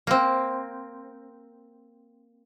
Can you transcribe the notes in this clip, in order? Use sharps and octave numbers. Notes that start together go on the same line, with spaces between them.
A#3 C4